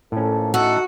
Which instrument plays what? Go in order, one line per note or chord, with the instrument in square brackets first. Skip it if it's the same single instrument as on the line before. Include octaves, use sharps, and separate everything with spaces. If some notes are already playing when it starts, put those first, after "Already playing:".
[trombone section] F2 A#3 A4 [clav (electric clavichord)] A2 C#4
[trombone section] A3 D#4 [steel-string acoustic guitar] F#4 [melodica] A4 F#5